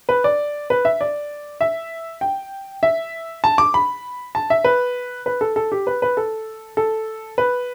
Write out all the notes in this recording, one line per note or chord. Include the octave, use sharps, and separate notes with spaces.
B4
D5
B4
E5
D5
E5
G5
E5
A5
D6
B5
A5
E5
B4
B4
A4
A4
G4
B4
B4
A4
A4
B4